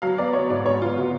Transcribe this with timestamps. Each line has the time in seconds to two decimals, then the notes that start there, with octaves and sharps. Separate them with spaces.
0.02 F#3 F5
0.18 B3 D5
0.33 B3 C#5
0.50 G#2 D5
0.65 G#2 C#5
0.82 B3 F4
0.97 B3 F#4